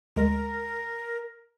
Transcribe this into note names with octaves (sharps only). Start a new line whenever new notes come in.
D2 G#3 A#4